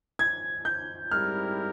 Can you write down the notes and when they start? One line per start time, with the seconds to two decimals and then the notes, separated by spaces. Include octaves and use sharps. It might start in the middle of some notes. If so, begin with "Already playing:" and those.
0.19 G#6
0.65 G6
1.11 G#2 G3 C4 E4 A#4 F6